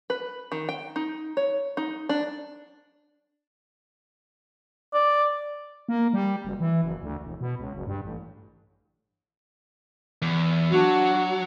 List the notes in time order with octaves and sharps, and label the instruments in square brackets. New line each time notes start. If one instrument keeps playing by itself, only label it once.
[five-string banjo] B4
D#3
G5
D#4
C#5
D#4
D4
[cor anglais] D5
[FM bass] A#3
G3
F#1
E3
F#1
D2
E1
B2
C#2
F#1
G2
A1
[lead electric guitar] E2
[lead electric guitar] F#3 [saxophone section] D4 F#4